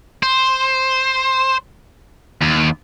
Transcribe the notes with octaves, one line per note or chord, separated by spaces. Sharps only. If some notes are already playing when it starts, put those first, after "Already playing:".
C5
D#2